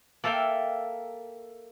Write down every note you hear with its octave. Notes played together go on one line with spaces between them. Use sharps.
A#3 A4 E5 F5 G5